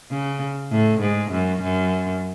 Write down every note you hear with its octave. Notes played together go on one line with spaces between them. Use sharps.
C#3
A2
G#2
F#2
F#2